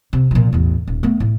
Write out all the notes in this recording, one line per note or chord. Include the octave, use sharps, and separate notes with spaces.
C3
A#2 F3
A1 E2
D#1
A3 B3
A2